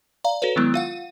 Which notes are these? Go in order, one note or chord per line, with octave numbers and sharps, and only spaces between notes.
D5 F5 A#5
F#4 A4 B4 C#5
D#3 F#3 G#3 B3 E4
F4 F5 F#5